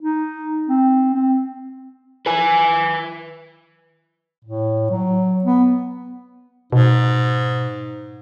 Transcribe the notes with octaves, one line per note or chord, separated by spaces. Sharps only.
D#4
C4
C4
B4 G#5
A2
F#3
B3
G#2 B2